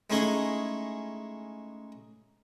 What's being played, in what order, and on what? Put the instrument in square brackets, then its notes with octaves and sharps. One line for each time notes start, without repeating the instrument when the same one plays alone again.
[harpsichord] G#3 A3 C#4 D#4 E4 G#4